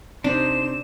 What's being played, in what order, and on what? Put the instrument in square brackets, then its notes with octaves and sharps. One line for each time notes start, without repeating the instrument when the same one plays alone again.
[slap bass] C3 [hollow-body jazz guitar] D4 [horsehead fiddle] D#4 C5 [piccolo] E7